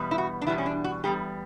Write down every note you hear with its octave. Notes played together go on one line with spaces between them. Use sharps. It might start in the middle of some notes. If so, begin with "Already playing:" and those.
Already playing: E2 B2 G3 B3
E4
F#4
D4
E2 B2 G3 B3 E4
C#4
D4
F#4
E2 B2 G3 B3 G4